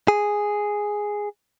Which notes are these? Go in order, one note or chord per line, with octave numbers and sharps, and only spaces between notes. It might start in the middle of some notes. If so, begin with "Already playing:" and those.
G#4